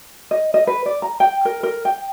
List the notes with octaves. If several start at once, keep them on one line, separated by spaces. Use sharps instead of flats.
D#5
D#5
B4
D5
A#5
G5
A#4
A#4
G5